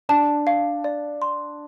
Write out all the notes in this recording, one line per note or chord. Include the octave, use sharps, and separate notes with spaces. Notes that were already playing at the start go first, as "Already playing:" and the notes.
D4 A5
F5
D5
C6